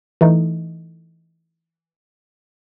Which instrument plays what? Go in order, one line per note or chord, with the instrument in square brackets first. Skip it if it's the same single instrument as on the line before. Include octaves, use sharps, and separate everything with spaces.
[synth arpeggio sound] E3 A3 D#4